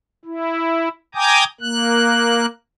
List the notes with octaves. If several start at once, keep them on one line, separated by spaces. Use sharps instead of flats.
E4
G5 G#5 A#5 D6 D#6 G6
A#3 F#6